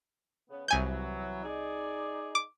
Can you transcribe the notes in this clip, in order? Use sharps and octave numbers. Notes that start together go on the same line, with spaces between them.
C#3 B3
C2 E3 F#3 G#5 G6
D#4 G#4 D5
D6